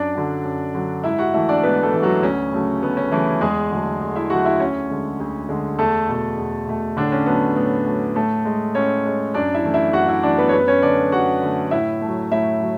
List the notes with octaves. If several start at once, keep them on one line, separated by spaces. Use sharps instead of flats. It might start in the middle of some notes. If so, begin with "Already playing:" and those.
Already playing: F#2 D4 D5
D3 F#3
F#2
D3 F#3
G#2 E4 E5
F#4 F#5
E3 A3 E4 E5
D4 D5
G#2 B3 B4
A3 A4
E3 A3
F#3 F#4
D2 C#4
C#3 F#3 A3
D2 B3
C#4
C#3 E3 F#3 A3 E4
E2 G#3 G#4
D3 F#3 A3
E2
E4 E5
D3 F#3 A3 F#4 F#5
E4 E5
D2 C#4 C#5
D3 G#3
D2
D3 G#3
E2 A3 A4
B2 A3
E2
B2 A3
A2 D3 D4
C#4
F#3 A3 B3
A2 B3
F#3 A3
A2 A3 A4
G#3
A2 C#4 C#5
G#3
F#2 D4 D5
E4 E5
E3 A3
E4 E5
F#2 F#4 F#5
E4 E5
E3 A3 D4 D5
B3 B4
C#5
F#2 B3 B4
C#4 C#5
D3 A3 D4 D5
F#2 F#4 F#5
D3 A3
A2 E4 E5
A3
F#3
A2 E4 E5
F#3